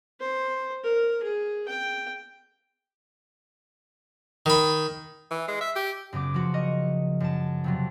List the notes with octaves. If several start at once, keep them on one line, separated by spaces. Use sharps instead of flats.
C5
A#4
G#4
G5
D#3 B5
E3
G#3
E5
G4
F#2 C#3 B3 D6
F3 A#3 F#4
A#4 D#5 C#6
F#2 A5
F2 C3 F#3